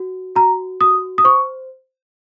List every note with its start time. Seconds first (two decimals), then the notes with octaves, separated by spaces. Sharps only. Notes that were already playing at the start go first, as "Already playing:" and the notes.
Already playing: F#4
0.35 F#4 A#5
0.80 F#4 D#6
1.18 D#6
1.24 C5 C#6